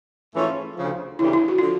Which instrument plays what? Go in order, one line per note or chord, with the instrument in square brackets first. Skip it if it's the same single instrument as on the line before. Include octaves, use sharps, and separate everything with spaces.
[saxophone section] G#2 E3 A3 C#4 F4
D2 C#3 F3
[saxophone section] D2 C#3 E3 G3 [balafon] E4
[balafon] E4
F#4
[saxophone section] D3 F3 [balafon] F4